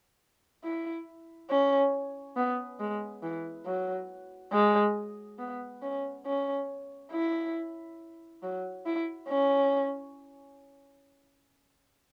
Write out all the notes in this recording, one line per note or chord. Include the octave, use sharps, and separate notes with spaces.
E4
C#4
B3
G#3
E3
F#3
G#3
B3
C#4
C#4
E4
F#3
E4
C#4